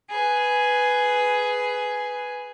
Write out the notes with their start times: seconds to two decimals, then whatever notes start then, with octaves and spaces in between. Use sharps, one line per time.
0.11 G#4 B4